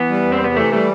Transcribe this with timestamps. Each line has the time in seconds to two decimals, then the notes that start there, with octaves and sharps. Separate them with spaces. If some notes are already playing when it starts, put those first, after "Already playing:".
Already playing: E3 B3
0.09 G3
0.25 E2
0.32 C4
0.41 C3 B3
0.56 E3 A3
0.72 G3 A3